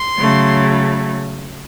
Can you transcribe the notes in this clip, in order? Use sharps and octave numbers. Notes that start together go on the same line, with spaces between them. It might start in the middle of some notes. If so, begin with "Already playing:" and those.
Already playing: C6
C#3 F#3 A3